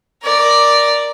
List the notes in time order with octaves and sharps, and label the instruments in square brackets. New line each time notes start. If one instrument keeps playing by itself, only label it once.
[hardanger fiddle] A#4 D5